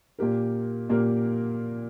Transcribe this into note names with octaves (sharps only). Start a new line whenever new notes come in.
A#2 A#3 G4 A#4
A#2 A#3 G4 A#4